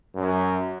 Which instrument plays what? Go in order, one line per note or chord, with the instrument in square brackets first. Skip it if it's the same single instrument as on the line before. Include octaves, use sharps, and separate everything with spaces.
[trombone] F#2